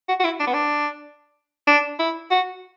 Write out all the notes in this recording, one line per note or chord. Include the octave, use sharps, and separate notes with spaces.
F#4
F#4
E4
D4
B3
D4
D4
E4
F#4